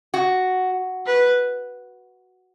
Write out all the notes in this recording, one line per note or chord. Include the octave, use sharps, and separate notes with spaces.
F#4
B4